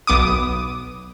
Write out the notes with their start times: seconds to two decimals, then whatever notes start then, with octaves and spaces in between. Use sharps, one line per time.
0.07 B1 B3 D6 D#6